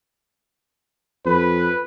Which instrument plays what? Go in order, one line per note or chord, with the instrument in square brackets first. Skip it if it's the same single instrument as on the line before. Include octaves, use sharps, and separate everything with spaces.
[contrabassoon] F2 [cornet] B4